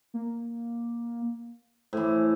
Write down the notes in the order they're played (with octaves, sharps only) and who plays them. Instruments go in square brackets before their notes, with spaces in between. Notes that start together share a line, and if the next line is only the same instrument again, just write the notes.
[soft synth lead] A#3
[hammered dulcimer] A2 E3 [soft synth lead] C5